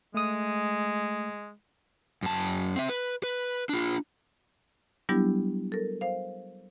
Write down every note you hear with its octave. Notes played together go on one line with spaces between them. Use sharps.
G#3 A3 D#6
F#2 A5
C4 E5
B4
B4
D4 F4
F#3 G3 B3 D4 E4 G4
A4 A#4
C5 F5